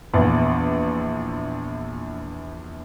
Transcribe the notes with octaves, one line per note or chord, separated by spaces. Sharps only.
A#1 E2 B3